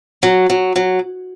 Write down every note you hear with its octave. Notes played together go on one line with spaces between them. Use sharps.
F#3
F#3
F#3